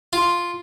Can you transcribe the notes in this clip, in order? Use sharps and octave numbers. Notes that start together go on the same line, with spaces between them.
F4